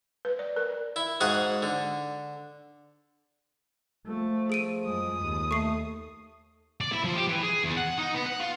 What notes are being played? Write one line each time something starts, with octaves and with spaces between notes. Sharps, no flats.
B4
D5
A#4
E4
G#2 F#4 G#4 F5 F#5
D3
F3 A3
G#4 D7 D#7
F#2 G#3 D#6
D#2
A3 C#6 C7
D5
E4
F3
G4
E3
G#4
E2
F#5
D#4
B3
F#5
F4